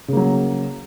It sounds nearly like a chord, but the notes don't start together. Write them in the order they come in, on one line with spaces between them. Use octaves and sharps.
C#3 A#3 F#3